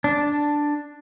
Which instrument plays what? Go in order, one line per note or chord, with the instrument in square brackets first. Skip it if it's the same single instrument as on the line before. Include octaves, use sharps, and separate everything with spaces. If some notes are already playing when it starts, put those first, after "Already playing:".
[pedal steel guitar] D4